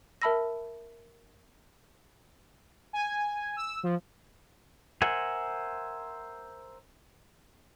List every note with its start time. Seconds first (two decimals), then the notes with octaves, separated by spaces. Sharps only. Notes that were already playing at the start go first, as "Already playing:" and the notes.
0.22 A#4 E5 A5 B5 E6 A#6
2.93 G#5
3.56 E6
3.83 F3
5.02 A#4 C5 E5 F#5 G#5